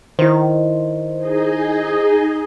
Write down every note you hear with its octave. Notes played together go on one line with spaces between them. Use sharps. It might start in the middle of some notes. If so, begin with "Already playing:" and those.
D#3 E4 C5
D#4 G#4 D#5